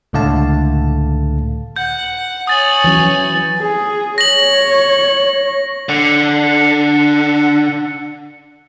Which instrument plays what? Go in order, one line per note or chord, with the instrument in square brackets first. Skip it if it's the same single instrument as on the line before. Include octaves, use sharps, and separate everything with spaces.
[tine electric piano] C#2 A2 D3 A3 F5 A5
[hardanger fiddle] F#5 [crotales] G6
[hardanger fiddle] C#5 G#5 [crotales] D#6 A6 F#7
[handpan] E3 F#3 C#4
[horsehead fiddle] G#4
[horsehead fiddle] C#5 [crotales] A#6 F#7
[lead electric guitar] D3 [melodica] F#5